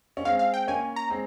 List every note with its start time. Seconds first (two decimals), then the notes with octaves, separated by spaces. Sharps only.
0.17 C#4
0.25 G#3 C4 F5
0.39 F5
0.54 G5
0.68 A#3 C#4 G#5
0.96 A#5
1.10 G#3 C4